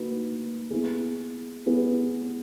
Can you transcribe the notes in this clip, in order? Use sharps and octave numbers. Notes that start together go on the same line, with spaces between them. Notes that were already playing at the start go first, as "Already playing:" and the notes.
Already playing: A#3 D#4 F#4 B4
B3 E4 G#4
B3 E4 G#4